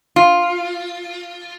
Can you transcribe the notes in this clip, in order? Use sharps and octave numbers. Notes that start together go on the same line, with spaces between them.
F4